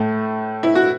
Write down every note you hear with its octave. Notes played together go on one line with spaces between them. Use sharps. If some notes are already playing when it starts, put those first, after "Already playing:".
Already playing: A2 A3
E4
F#4